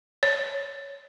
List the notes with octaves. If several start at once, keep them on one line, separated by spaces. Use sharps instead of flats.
C#5